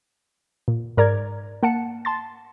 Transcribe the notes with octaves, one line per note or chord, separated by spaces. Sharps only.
A#2
G#2 A#4 D5 A#5 G#6
A#3 F#5 A5 C#7
A5 C6 A6